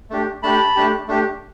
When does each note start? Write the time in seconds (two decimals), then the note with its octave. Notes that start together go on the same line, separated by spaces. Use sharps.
0.10 A3 D4 G4
0.43 A3 D4 G4 A5 B5
0.75 A3 D4 G4
1.08 A3 D4 G4